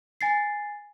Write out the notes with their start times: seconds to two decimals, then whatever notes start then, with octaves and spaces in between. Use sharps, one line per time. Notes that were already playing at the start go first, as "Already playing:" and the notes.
0.21 G#5 A6 C7